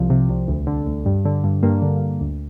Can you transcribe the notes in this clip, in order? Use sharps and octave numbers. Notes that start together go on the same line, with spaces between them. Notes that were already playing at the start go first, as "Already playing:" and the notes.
Already playing: C2 F3
C3
C2
D2
D3
D2
G2
D3
G2
G2 A#3
D3
G2
D2